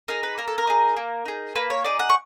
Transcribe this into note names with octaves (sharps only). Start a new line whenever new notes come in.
D#4 G#4 A#4
B4
A#3 A#4
A4
A#4
D#4 G#4
A#3
D#4 G#4
A#3 B4
C#5
D#4 G#4 D5
F#5
C#6